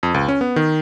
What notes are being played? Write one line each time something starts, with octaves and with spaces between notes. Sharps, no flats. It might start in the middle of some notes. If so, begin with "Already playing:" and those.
F2
C#2
C#4
B3
D#3